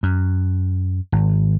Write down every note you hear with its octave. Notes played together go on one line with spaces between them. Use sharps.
F#2
G#1